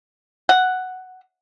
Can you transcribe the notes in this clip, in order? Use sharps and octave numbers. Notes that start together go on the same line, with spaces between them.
F#5